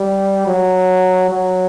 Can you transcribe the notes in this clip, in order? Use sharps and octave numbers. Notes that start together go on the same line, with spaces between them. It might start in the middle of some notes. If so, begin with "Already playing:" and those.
Already playing: G3
F#3
F#3